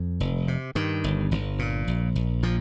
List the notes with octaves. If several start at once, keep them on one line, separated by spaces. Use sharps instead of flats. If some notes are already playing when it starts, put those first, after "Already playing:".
Already playing: F2
F1
C3
G2 D#3
G1
G1
A#2
A#1
A#1
A#2 F3